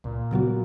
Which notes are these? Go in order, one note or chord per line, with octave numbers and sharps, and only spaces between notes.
C#2 A#2
C#3 F#3 B3 F#4